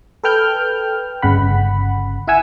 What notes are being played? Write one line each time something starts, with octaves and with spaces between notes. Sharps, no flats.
A4 B4 G5 F6 G6
G1 C#3 F#5 B5
E4 E5 F#5 G#5 E6